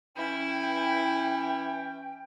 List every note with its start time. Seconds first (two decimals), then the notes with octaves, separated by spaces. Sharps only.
0.17 E3 C#4 E4 G5